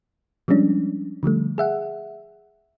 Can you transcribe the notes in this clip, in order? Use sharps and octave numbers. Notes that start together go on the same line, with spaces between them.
F3 G3 G#3 C#4 D4
D3 F3 G3 A3
G#4 E5 F#5